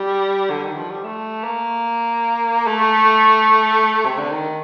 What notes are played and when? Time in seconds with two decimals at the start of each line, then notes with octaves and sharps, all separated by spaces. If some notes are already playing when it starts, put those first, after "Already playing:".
Already playing: G3
0.50 D3
0.64 D#3
0.77 F3
0.90 G3
1.04 A3
1.44 A#3
2.67 A3
4.05 C3
4.18 D3
4.31 D#3